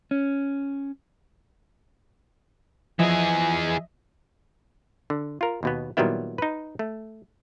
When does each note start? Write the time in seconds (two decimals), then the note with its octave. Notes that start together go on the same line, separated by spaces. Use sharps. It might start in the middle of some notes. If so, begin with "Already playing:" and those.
0.11 C#4
2.99 E3 F3 G#4 D#5 E5
5.10 D3
5.41 F4 A#4
5.63 D#2 B2 B3
5.97 A#2 D#3 F#3 G3 B3 E4
6.38 D#4 B4
6.79 A3